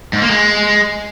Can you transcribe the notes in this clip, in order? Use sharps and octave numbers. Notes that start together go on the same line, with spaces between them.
G#2
A#3
G#3